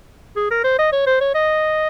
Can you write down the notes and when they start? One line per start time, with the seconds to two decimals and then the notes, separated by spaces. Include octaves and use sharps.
0.36 G#4
0.51 A#4
0.64 C5
0.79 D#5
0.92 C#5
1.06 C5
1.21 C#5
1.35 D#5